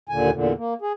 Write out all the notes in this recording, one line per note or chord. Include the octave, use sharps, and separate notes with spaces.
D#2 A#2 D3 G#5
E2 A#2 D3
A#3
G#4